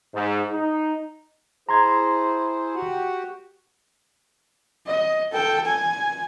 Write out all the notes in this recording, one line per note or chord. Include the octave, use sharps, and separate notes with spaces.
G#2
D#4
E4 G#4 C5 A#5 C6 G#6
F#4 G4 F#5
D#5
A4 G5
G#5